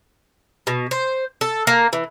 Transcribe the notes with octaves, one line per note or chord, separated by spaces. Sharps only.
B2
C5
A4
A#3
E3